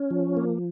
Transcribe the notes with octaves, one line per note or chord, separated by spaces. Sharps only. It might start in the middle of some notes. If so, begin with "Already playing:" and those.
Already playing: C#4
F3
A#3